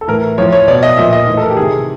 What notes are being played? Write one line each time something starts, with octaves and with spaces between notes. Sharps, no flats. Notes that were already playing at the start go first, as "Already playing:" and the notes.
A4
A2 E3 A#4
A2 F3 C#5
C#5
B2 D5
D#5
A#2 F3 E5
D#5
A2 E3
A4
A#4
G4
C3 D#3 G#4